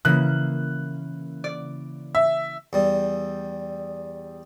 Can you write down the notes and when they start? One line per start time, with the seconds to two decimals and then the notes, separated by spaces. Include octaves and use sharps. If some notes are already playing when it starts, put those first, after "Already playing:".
0.05 C#3 E3 A#3 F#6
1.44 D5
2.15 E5
2.73 E2 G3